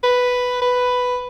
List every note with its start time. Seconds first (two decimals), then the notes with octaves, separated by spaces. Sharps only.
0.03 B4
0.61 B4